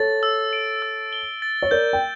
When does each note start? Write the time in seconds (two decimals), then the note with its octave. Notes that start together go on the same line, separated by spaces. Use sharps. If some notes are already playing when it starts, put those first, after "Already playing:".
Already playing: A4 C#5 A6
0.23 E6
0.53 D7
0.82 E6
1.13 G7
1.42 A6
1.62 C#5
1.71 A#4 D5 G6
1.93 G5